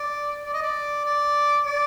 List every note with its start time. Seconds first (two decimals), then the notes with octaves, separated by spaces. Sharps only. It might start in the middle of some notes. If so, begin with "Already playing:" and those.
Already playing: D5
0.45 D5
0.53 D#5
0.62 D5
1.05 D5
1.66 D5